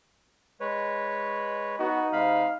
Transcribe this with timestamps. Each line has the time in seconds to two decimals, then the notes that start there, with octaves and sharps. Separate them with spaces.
0.60 G#3 B4 C#5
1.79 B3 D#4 F#4
2.13 C3 G#3 F5 B5